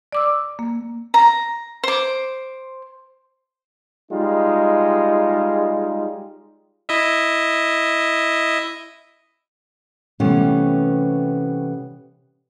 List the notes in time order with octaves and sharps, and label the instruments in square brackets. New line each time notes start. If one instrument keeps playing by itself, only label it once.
[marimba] D5 D6 E6
A#3
[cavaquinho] A#5
C5 D6
[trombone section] G3 G#3 D#4 F4
[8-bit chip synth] E4 D#5 E5
[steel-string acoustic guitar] C3 E3 G3 A3 B3 C#4